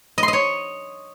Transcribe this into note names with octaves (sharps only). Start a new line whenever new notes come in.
D#5
C6
D#5
C#5